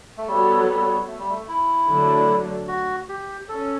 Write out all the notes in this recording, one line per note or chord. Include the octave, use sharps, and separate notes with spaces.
A3
G3 B3 F#4 A4 C#5
F#3
G3
A3
G3
A3
E4
D3 F#3 A3 D4
F#4
G4
C#4 A4